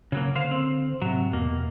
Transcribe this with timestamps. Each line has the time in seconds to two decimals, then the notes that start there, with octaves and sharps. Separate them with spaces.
0.12 C#3 F#3 A#3
0.35 D3 C5 F5
0.51 C4
1.02 G#2 C3 F#3
1.33 E2 B2 A#3